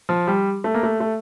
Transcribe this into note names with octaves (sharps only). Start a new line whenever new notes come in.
F3
G3
A3
A#3
A3
A3